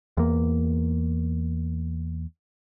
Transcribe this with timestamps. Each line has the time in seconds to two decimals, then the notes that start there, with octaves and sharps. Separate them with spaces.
0.17 E2 A#3